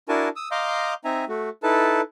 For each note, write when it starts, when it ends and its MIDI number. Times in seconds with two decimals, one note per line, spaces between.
0.09 0.29 62
0.09 0.29 64
0.09 0.29 66
0.09 0.29 70
0.09 0.29 80
0.09 0.29 81
0.36 0.49 87
0.36 0.49 88
0.51 0.94 75
0.51 0.94 77
0.51 0.94 82
0.51 0.94 84
0.51 0.94 86
0.51 0.94 91
1.05 1.25 60
1.05 1.25 63
1.05 1.25 76
1.05 1.25 80
1.05 1.25 82
1.28 1.49 57
1.28 1.49 66
1.63 2.01 63
1.63 2.01 64
1.63 2.01 69
1.63 2.01 71
1.63 2.01 81